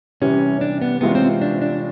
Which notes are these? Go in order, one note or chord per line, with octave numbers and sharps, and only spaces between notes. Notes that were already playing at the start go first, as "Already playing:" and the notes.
C3 E3 G3 C#4
D4
B3
C3 E3 G#3 B3 C#4 F4
C4
D4
D4